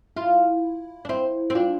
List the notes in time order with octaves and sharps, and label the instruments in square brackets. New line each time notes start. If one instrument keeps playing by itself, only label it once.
[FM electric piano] E4 [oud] F4
[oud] D4
[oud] C4 [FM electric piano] E4
[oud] C4
[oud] D4 [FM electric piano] F4